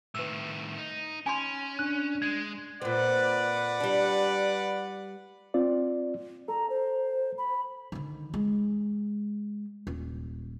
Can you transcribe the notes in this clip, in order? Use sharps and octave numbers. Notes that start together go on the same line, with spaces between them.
A2 D#3 B4 E6
D#4
C#4 G#5 B5 C6
D4 F#6
G#3 G#6
A#2 C4 B4 D5 F#5
G3 D4
C4 F4 D5
A4 A#5
C5
B5
D3 D#3
G#3
D#1